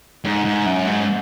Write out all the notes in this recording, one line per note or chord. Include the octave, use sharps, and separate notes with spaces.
G#2
G#2
F#2
G#2